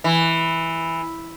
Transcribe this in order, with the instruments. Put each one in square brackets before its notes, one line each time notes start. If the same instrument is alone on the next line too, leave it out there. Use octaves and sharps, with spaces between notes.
[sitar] E3